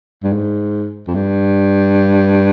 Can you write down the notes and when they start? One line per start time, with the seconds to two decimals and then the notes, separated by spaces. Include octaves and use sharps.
0.23 G2
0.33 G#2
1.08 F2
1.15 G2